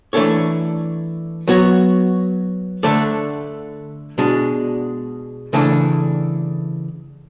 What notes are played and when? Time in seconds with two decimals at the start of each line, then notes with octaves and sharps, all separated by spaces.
0.13 E3 A3 D4 A4 C#5
1.48 F#3 B3 F#4 C#5
2.83 D3 A3 D4 A4 D5
4.18 B2 G#3 D4
5.53 C#3 E3 A3 D4